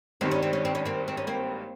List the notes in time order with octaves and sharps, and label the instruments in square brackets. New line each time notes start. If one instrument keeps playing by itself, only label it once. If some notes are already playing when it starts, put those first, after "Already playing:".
[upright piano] G#1 G2 D#3 G3 [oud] C4
[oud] C#4
C4
C#4
C4
C#4
A#3 C4
C4
C#4
A#3 C4